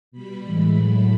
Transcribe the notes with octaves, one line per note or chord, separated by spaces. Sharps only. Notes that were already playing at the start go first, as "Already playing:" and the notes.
B2 G3 B5
A2 E3 G#3
A2 F#3 A3